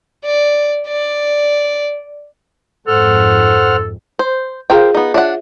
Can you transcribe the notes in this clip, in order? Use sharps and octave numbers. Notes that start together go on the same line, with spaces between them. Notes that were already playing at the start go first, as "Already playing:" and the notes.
D5
D5
F2 G#2 A4 C5 F#5 F6
C5
F4 G#4 A#4 C5 F5 G5
B3 D#4
D4 F4 C#5 E5 F#5